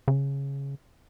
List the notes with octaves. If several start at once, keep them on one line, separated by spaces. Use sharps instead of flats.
C#3